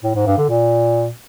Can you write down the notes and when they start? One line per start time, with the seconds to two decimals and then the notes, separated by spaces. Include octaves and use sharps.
0.04 A2
0.15 G#2
0.27 G2
0.38 D3
0.49 A#2